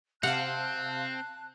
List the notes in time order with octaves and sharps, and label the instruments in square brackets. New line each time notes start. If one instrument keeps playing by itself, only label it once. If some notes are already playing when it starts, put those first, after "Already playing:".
[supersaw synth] C3 F5 [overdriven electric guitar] C4 [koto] F#5 [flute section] A5 F#6